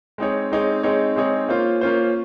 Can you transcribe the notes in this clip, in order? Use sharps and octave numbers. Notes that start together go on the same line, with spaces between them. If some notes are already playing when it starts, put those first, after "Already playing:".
G#3 C4 D#4 G#4 C#5
G#3 C4 D#4 G#4 C#5
G#3 C4 D#4 G#4 C#5
G#3 C4 D#4 G#4 C#5
A#3 C#4 F4 C5
A#3 C#4 F4 C5